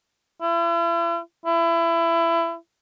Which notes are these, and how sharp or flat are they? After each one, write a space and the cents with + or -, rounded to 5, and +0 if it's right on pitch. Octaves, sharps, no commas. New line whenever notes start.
E4 +45
E4 +25